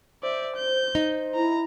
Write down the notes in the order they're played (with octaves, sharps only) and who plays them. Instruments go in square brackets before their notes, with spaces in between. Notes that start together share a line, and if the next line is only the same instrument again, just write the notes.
[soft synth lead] C5 [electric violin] D5 E5
[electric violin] G6
[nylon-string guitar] D#4
[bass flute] E4 [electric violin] A#5